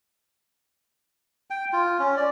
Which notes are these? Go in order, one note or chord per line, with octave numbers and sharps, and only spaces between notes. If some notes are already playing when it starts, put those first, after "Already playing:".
G5
F4
C#4
D5